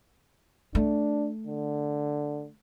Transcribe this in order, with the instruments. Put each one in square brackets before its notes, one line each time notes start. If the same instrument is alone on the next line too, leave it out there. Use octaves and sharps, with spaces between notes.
[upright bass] A3 [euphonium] D4
[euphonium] D3